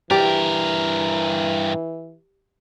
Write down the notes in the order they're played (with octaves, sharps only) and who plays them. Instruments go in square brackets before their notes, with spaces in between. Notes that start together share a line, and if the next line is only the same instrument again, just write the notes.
[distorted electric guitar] G2 A#4 [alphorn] E3 [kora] G4 D5